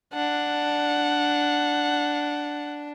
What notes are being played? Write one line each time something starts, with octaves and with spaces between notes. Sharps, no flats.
D4 F#5